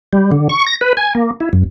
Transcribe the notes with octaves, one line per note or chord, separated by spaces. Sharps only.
G3
D3
C#6
A#6
B4
G#5
A#3
E4
F#2